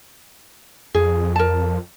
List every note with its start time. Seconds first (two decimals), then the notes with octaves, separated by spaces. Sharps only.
0.94 F2 G#4
1.36 A#4 A5